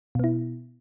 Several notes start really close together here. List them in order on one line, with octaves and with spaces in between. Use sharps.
B2 B3 E4